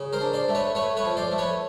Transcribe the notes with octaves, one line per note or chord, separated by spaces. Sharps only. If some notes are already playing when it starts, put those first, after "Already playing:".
Already playing: C#3
A#4 C5
D4
C5 D5
A3
B4 C#5
A3 B4 C#5
B4 C#5
F3
C5 D5
A3
B4 C#5